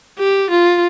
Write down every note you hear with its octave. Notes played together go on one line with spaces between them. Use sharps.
G4
F4